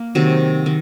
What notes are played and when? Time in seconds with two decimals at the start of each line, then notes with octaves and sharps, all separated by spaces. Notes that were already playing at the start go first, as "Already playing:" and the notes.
Already playing: A#3
0.15 C3 D#3 F#3
0.66 D#3